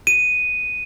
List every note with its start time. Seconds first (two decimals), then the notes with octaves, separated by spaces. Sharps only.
0.07 D#7